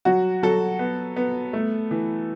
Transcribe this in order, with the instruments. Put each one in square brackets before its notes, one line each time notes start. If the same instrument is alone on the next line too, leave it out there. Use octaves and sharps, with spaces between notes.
[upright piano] F#3 F#4
F#3 A4
B3
B3
A3
E3